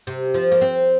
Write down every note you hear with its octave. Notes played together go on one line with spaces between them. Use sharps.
C3
F3
A#3
C4